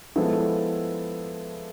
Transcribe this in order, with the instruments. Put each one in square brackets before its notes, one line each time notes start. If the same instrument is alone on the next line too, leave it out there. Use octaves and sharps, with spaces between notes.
[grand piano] F3 G#3 B3 E4 A4